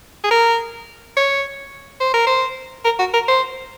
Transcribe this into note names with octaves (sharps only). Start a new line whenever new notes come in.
G#4
A#4
C#5
C5
A#4
C5
A#4
F#4
A#4
C5